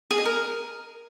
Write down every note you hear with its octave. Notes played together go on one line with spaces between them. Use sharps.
G#4
D#5
A#4